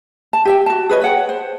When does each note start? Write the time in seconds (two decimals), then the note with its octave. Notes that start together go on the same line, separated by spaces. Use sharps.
0.33 A5
0.45 G4 E5 G5
0.66 F#4 A5
0.89 G#4 B4 C#5 D#5
1.02 C#5 F#5 G5
1.29 C5